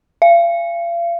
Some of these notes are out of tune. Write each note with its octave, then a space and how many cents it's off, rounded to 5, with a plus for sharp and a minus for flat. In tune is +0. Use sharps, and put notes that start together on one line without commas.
F5 -40